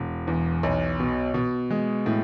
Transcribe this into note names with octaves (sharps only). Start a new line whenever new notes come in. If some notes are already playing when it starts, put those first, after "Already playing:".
Already playing: E1
E2
B1
B2
B2
G#3
A2